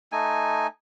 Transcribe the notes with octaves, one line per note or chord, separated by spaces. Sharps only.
A3 D#4 G#5